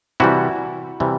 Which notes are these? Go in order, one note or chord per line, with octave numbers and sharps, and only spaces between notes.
C3 E3 G3 E4 F#4
C3 E3 G3